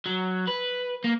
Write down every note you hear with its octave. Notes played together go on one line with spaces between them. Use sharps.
F#3
B4
A#3